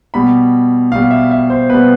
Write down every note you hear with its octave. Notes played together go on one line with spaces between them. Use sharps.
B2 G3 B5
B2 G3 F5
E5
E5
C5
B2 G3 B4